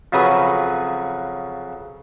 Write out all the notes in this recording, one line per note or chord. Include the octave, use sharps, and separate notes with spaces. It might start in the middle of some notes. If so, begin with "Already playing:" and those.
F2 C#3 F#3 B4 D#6